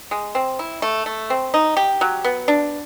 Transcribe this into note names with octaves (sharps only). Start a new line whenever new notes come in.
G#3
C4
E4
A3
A3
C4
D#4
G4
F#3
B3
D4